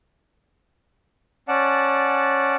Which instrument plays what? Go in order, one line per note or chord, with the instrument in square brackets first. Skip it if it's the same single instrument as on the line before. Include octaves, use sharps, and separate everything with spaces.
[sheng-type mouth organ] C#4 D5 F#5 A5